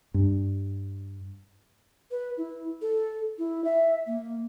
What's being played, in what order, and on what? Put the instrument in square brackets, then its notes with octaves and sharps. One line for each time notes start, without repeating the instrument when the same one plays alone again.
[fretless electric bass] G2
[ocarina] B4
E4
A4
E4
E5
A#3